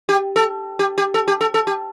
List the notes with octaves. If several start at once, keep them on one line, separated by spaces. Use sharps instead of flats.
G4
A4
G4
G4
A4
G4
A4
A4
G4